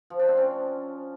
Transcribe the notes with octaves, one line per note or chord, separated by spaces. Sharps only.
F3
D4
C4
C#4